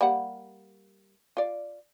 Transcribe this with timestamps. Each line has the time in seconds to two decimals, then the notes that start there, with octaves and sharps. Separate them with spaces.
0.01 G3 A#3 F#5
1.37 F4 D5